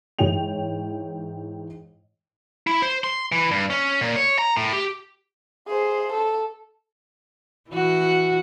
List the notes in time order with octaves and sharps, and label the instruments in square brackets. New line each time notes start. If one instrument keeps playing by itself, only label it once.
[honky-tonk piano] G#2 E3 C#5 G5 F7
[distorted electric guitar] E4
C5
C6
E3
G2
C#4
A#2
C#5
A#5
A2
G4
[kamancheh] G#4 C5
A4
[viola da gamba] E3 F#4